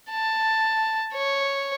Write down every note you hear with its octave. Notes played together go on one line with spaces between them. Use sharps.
A5
C#5